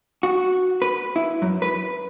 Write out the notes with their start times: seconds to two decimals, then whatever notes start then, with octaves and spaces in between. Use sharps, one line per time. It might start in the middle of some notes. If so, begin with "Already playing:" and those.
0.23 F#4
0.82 B4
1.16 E4
1.42 F#2
1.62 B4